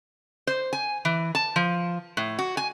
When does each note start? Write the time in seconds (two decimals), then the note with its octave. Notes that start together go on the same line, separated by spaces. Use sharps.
0.47 C5
0.73 G#5
1.05 E3
1.35 A5
1.56 F3
2.17 A2
2.39 F#4
2.57 G#5